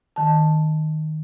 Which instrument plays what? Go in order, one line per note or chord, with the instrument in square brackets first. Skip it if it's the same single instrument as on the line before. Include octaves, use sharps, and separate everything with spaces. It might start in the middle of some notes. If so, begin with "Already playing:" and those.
[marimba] D#3 A5